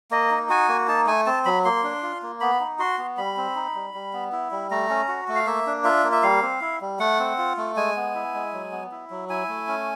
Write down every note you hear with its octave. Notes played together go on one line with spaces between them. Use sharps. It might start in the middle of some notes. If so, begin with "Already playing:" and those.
A#3 D#5
D#4
F#4 G#5
A#3
D#4 A5
A3 G#5
C4 A5
F#3 B5
A#3 C6
D4
F4
A#3
B3 B5
D#4
F#4 C6
B3
G3 B5
C4
D#4
G3
G3
B3
E4
G3
A3 A#5
C#4
F#4
A3
F5
A#3 E5
D4
F4 E5
A#3
E5
G3 F5
C4
E4
G3
A3 F#5
C4
F4
A3
G#3 G#5
B3
E4
G#3
F#3
B3
E4
F#3
E4 G#5
A3
C#4